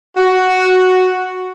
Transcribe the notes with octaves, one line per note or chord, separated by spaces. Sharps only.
F#4